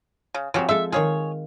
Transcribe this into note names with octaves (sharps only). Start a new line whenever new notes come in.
C#3
C#3 F3 C4 F#4 G4
F3 G#3 A4 E5
D#3 F4 G#4 C#5